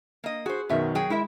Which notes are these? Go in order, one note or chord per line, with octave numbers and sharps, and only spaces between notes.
A#3 D#5
F#4 G#4 C5
F#2 B2 D#3 F#3 E5
F#3 G#4 G5
G#3 E4 A#4 E5